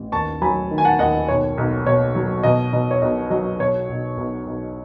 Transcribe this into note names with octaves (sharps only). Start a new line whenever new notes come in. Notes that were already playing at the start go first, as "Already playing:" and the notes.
Already playing: A1
D#2 A5 C#6
F#3 G#5 B5
D#3
G#5
F#5 A5
D#2 D#5 F#5
D#5
B1 C#5
B1
B2 C#5
F#3
B2 D#5
B2
C#5
B1 D#5
F#3 D#5
B2 C#5
B1
B1
B1